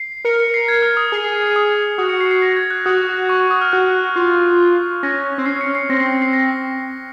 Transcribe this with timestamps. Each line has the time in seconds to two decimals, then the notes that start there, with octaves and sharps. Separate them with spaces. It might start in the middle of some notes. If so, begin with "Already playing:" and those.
Already playing: C7
0.25 A#4 C#7
0.40 C#7
0.54 C7
0.68 G#6
0.82 F6
0.97 D#6
1.12 G#4
1.56 D#6
1.98 F#4 D#6
2.09 C#7
2.21 C7
2.31 C7
2.42 A#6
2.56 G#6
2.71 F#6
2.86 F#4 D#6
3.29 C#6
3.40 C#6
3.51 D#6
3.62 F6
3.72 F#4 F#6
4.16 F4
5.03 C#4 A#6
5.38 C4
5.46 C#4 C7
5.61 C#7
5.75 C7
5.89 C4 A#6
6.00 C7
6.11 C#7
6.22 C7
6.33 A#6